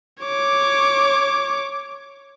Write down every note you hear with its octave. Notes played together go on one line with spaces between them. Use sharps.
C#5 D6